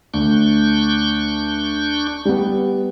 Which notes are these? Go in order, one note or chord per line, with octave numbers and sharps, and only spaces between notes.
D2 D4 C#6 G6
G3 B3